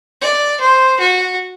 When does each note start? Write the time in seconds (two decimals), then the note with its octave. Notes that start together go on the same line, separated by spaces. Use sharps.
0.21 D5
0.60 C5
1.00 F#4